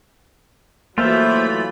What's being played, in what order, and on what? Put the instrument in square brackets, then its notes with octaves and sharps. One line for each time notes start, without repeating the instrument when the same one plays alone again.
[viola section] E3 F#3 B5 [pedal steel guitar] A3 F4 [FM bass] A#3 [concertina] C5 E5